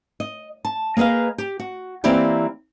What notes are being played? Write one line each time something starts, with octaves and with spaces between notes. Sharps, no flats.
D#5
A5
A#3 G#4 B4 D#5 F5
G4
F#4
E3 A#3 C4 E4 G4 D5